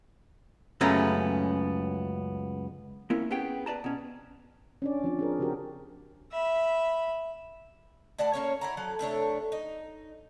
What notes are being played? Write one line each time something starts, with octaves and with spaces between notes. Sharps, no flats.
C#2 F#2 A3 B3 C#4 A#5
A#3 C4 C#4 E4 A#4
B3 C#4 G4 G#4 G5
B4 D5 A5 A#5
B2 C#4
C#4 D4 D5
F3 C4 D4
D4 G#4 A#4
C#3 F#4 G4 A#4
E5 B5
A2 D5 F#5 A5
A#3 C#4 C#5
E4 F#5 A#5
F3 F#3 A4
C3 A3 D4 C#5
D#4